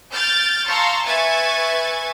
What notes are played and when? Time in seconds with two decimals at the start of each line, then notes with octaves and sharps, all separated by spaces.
0.11 F6 G6 A6 D7
0.67 F5 A5 A#5 C6 C#6 E6
1.05 B4 E5 G#5 C#6 G#6 A6